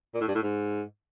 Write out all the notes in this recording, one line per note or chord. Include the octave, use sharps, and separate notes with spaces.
A#2
A2
G2
A2
G#2